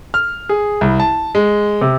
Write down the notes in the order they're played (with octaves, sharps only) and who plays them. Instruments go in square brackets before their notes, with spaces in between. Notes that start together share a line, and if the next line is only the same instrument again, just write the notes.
[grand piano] F6
G#4
C2
A5
G#3
C3